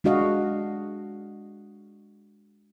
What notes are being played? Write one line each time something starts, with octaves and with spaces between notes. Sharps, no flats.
G#3 D4 F#4 D#5 F5